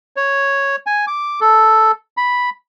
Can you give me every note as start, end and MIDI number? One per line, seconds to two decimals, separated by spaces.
0.16 0.76 73
0.86 1.05 80
1.07 1.40 86
1.41 1.92 69
2.17 2.50 83